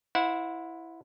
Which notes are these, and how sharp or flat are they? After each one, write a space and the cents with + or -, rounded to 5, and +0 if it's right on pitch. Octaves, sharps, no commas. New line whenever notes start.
E4 +0 C5 +0 F#5 -30